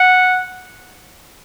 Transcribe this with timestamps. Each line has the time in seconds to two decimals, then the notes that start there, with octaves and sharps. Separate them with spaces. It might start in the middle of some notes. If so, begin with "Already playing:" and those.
Already playing: F#5